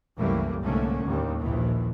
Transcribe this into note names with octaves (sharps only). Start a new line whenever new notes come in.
C2 F#2 E3 G3 A3 A#3
C2 G#2 D3 A3 A#3 C#4
D#2 A2 G3
A#1 D#2 D#3 E3